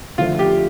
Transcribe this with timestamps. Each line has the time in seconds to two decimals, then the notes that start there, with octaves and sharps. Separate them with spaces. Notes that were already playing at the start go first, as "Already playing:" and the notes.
0.18 D3 F3 A3 F4
0.39 G4